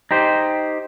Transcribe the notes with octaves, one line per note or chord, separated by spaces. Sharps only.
D#4 G4 C5